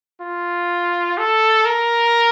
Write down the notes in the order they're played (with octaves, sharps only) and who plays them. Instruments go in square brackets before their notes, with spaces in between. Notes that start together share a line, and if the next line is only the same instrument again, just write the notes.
[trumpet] F4
A4
A#4